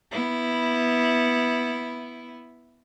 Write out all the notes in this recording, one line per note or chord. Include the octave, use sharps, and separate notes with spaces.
B3 E4